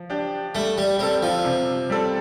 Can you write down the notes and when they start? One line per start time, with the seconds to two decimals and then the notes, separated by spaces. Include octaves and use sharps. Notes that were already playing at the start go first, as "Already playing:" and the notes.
Already playing: F3
0.10 D4 G4
0.55 G3 A3
0.78 G3
0.99 G3 C4 A4
1.23 F3
1.45 C3
1.90 G3 C4 A4